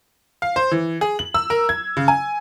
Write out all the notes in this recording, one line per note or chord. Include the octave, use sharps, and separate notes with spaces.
F5
C5
E3
G#4
F#7
E6
A#4
G#6
C#3
G#5